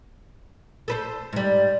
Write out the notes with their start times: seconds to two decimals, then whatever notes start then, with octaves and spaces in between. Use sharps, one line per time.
0.88 A4 B4 C5
1.33 G#2 G3